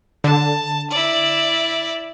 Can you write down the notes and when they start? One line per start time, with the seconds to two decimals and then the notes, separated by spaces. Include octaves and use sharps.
0.24 D3 A5
0.91 E4 D5